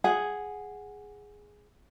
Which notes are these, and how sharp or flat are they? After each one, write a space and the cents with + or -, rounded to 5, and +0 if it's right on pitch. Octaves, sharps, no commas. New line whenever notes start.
G#4 +0 F#5 +0